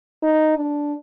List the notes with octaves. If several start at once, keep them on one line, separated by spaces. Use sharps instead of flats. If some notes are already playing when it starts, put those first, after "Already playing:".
D#4
D4